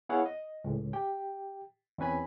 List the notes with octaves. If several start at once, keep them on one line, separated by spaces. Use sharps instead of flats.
B3 E4 G#4 C#5 F5 F#5
D#5
C#2 A2
G4 G5
E2 C4 C#4 B4 G#5 B5